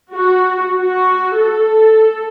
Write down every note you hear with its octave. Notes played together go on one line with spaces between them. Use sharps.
F#4
F#4
A4